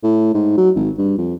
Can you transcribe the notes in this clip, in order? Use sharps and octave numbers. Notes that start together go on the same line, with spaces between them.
A2
G#2
F#3
G#1
G2
F2